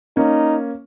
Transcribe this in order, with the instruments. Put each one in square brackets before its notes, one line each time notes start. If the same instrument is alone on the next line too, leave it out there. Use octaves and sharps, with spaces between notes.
[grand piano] A#3 C#4 [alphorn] D#4